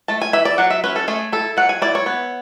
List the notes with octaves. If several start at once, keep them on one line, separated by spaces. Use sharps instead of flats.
A3 A5
G#5
E3 E5
D5
F#3 F#5
E5
C#4 B4
A4
A3 G#4
E4 A4
F#3 F#5
G#5
E4 D5
C#5
B3